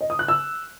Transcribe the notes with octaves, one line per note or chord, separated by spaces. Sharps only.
D#5
D#6
F#6
E6